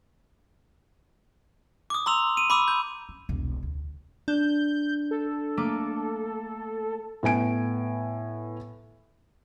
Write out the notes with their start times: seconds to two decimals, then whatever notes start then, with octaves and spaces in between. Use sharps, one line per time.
1.90 D6 D#6
2.06 A#5 C6 E6 F7
2.37 D#7
2.50 B5 D6 E6
2.68 G6
3.09 C#4
3.29 E1 C2
3.63 D2
4.28 D4 G6
5.11 A4
5.57 A3 A#3 D6
7.23 A2 B3 G#5 D7